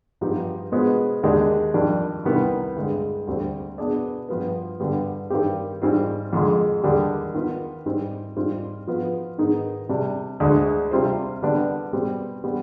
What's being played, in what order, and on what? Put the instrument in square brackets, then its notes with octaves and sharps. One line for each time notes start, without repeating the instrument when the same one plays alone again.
[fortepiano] G2 F3 B3 D#4 G4
B2 G#3 B3 F4 C5
D#2 D3 G#3 D4 G4
F2 D#3 G3 D4
C2 C3 D#3 G3 B3
G2 D3 G#3
D2 D3 G3 C4
B2 B3 D4 G#4 D5
G2 F3 B3 F4 B4
G2 D3 G3 B3
G2 D#3 G3 C4 G4
G#2 G3 C4 F4
F2 D3 G#3
D#2 D3 G3 D4 G#4
D#3 B3 F4 B4
G#2 G3 C4
G#2 G3 C4 F4
F3 B3 F4 B4
G#2 D#3 B3 D#4 G#4
C3 G3 D4
D2 D3 G#3 D4 G#4
C3 G3 C4 F4 C5
D3 G3 B3 D4
B2 G3 C4
B2 G3 B3